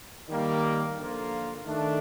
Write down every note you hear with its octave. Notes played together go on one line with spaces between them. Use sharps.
D#3 G3 A#3
D3 F3 A#3 F4
D#3 A3 D4